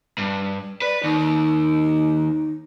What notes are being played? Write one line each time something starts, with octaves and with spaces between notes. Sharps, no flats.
G2
B4 D5
D#2 D#4